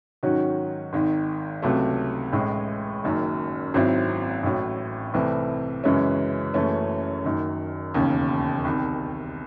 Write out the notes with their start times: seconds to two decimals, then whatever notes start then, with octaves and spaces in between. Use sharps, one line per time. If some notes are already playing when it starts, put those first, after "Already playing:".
0.23 G#2 D#3 F#3 C#4 F#4
0.93 G#1 G#2 D#3
1.62 C#2 C3 F#3 A3
2.33 A1 A2 G#3
3.04 F#1 F#2 D#3
3.74 G#1 G#2 F#3 C4 E4
4.43 A1 A2 F#3
5.14 C2 C3 E3 A3 C4
5.84 F#2 C#3 E3 G#3 C#4
6.54 F#1 F#2 E3 A3 C#4
7.25 F#1 F#2 D#3
7.94 E1 D#2 C#3
8.65 C2 C3 D#3